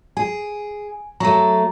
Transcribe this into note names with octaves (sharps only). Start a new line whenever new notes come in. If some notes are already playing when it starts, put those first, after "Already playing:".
G#4 G#5
F#3 A3 A#5